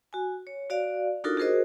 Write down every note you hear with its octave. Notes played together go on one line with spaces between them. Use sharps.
F#4 G#5
C#5
F#4 D5 F5
D4 D#4 F4 F#4 A4 A#4
F#4 G#4 A#4 C5 D#5